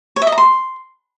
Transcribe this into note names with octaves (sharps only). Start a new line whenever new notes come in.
C#5
E5
D#5
A#5
C6